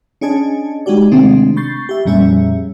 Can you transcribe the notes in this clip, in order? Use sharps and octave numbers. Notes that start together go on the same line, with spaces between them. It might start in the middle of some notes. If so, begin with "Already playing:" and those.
C#4 D4 G#4 D#5 G#5 A5
G#3 D#4 F#4 G4 D5
C3 D#3 G#3 A3 C4 D4
B5 C#6 G6 A6 C7
G4 E5
F2 A#2 G3 C#4 G#4 E5